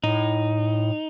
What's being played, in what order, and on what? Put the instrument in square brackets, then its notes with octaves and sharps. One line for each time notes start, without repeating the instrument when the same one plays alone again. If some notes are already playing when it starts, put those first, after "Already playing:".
[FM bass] A2 [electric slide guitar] D#4